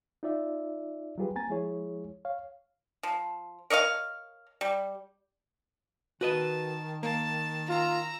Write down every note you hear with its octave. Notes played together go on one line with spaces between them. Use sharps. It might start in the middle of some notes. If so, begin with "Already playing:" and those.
D#4 F4 D5 E5
F#3 G3 F4 G4 G#4 B4
A#3 C4 G#5 A#5 A6
F3 G#3 E4 G#4 C#5
C#5 F5
F3
A#4 C#5 D#5 F5
G3
D#3 F#4 B4 D#5 A5
A#3 A5
F4 A#5 E6